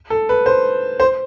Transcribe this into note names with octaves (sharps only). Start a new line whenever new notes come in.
A4
B4
C5
C5